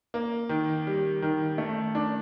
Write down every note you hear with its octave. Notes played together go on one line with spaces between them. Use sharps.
A#3
D#3
G3
D#3
A3
D4